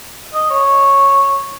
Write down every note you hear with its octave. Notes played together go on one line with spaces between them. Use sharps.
D#5
C#5